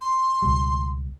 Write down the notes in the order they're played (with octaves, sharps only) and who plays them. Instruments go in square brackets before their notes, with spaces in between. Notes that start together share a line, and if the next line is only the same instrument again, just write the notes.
[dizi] C6
[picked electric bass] C#2 B2 G3